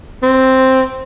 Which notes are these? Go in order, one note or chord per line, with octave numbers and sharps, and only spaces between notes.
C4